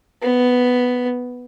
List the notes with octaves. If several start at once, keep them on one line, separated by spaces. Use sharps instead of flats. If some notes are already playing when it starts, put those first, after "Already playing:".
B3